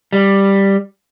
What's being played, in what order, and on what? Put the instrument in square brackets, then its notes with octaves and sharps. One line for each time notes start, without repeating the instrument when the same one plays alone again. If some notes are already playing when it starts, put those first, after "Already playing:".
[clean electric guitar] G3